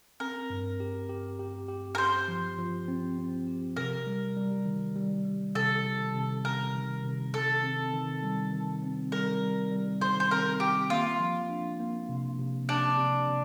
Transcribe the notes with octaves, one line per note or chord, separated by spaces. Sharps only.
C4 A#4
G2
G4
G4
G4
G4
A#4
G4 C5
F3
F3
C4
C4
G4
C3 A#4
G3
G3
D#3
G3
G3
C3 A4
D#3
C3
C3 A#4
D#3
C3
D#3 A4
C4
D#3
G3
D#3
C4
G3 A#4
G3
G3
D#3 C5
C5
C4 A#4
C4 G4
A#3 F4
F3
D4
A#3
C3
C3
C3 D4
C3
C3